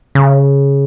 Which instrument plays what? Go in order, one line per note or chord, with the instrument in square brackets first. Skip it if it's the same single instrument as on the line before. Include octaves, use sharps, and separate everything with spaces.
[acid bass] C#3